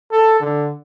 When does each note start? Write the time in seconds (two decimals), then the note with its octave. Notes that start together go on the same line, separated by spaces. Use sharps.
0.12 A4
0.40 D3